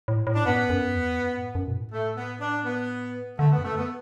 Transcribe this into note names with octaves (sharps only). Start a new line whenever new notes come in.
A2
A2
D4
F#2 B3
F#2
E2
F#2
A2
F#2
B2
A2
A3
B3
D4
B3
D3 A3
B3
F#2
A3
B3